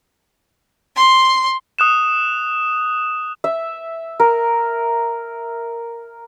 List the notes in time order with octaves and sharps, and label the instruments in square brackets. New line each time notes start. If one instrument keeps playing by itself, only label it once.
[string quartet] C6
[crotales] D#6 F#6 E7
[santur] E5
A#4